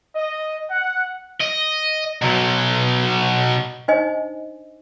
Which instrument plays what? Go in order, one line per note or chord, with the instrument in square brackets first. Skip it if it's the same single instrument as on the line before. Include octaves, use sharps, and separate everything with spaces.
[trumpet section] D#5
F#5
[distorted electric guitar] D#5
B2 F#3
[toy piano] D4 D#4 C5 D#5 G#5